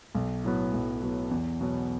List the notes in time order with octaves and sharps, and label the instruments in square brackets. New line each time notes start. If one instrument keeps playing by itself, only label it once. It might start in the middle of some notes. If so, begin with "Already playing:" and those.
[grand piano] B1
A2 F#3 B3
B1
A2 F#3 B3
E2
B2 F#3 B3